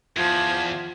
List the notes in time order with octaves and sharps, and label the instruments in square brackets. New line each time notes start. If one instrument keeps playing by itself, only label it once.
[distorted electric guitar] E2 [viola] F3 [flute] G#6